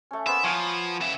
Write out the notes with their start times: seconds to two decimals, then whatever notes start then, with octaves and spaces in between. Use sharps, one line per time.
0.11 A3 C#4
0.27 A#3 B3 C5 E5
0.44 F3 C#5 F5 G#5
1.01 C#3 E5